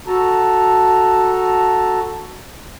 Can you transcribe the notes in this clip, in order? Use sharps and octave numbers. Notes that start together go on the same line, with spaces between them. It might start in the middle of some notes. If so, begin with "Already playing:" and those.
F#4 A4 A5 A#5